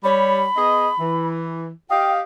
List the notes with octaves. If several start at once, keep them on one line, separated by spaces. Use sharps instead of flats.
G3 C#5 B5
B3 G#4 D#5
E3
G4 D#5 F5 G5